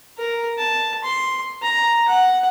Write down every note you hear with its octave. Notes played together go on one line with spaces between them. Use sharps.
A#4
A5
C6
A#5
F#5